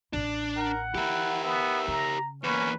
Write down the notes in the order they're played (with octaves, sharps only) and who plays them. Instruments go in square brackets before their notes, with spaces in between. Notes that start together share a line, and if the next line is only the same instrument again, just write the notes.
[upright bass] A1 E3 [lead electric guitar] D4
[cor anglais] A#4 [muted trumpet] F#5
[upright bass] E3 [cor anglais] E4 [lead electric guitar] G4 A#4
[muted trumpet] B3 [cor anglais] E5
[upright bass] C#3 [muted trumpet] A#5
[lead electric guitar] E2 A#3 [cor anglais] C#4 [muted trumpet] B4